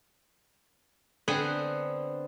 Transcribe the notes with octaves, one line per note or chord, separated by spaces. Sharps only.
D3 B3 C4 F#5 G#5